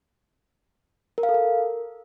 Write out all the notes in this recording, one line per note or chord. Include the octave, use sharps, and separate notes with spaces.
A#4
F5
A4
A#4